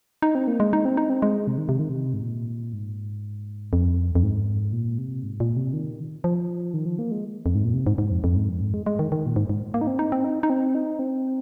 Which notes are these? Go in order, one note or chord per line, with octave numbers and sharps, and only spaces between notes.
D#4
C4
A#3
G#3
D#4
C4
D#4
C4
G#3
C3
D#3
C3
D#3
C3
G#2
A#2
G#2
F2
F2
G#2
A#2
C3
G#2
A#2
C3
D#3
F3
D#3
F3
A#3
G#3
F2
G#2
A#2
C3
G#2
G#2
F2
F2
G#2
F2
G#2
G#3
G#3
D#3
D#3
A#2
G#2
G#2
A#3
D#4
C4
D#4
C4
D#4
D#4
C4
D#4
C4